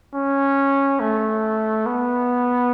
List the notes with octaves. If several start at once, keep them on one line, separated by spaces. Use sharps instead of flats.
C#4
A3
B3